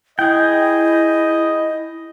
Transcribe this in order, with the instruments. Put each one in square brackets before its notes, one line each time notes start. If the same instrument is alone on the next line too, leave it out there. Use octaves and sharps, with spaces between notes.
[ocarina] E4 [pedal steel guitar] G#4 G5 [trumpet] D#5